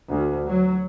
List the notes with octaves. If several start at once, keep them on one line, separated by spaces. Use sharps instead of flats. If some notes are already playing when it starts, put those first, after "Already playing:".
D2
F#3